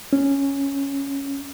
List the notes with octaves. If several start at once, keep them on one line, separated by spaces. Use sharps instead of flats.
C#4